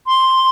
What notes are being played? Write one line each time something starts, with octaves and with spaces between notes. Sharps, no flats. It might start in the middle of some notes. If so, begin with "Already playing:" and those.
C6